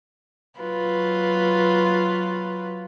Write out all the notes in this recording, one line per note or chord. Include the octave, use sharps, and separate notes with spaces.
F#3 F4 B4